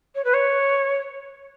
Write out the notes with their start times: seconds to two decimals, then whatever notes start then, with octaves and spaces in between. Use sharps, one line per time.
0.15 C#5
0.24 B4
0.34 C#5